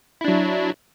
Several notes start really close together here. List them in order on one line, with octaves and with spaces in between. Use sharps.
E4 D4 F#3